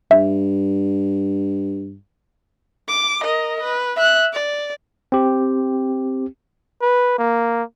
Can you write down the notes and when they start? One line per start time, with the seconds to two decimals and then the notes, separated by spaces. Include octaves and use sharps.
0.11 G2 E5
2.88 D6
3.24 A#4 D#5
3.62 B4
3.96 E5 F#6
4.33 D5
5.12 C4 G4
6.82 B4
7.19 A#3